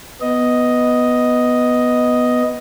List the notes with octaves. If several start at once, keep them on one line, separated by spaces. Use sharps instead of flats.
B3 D#5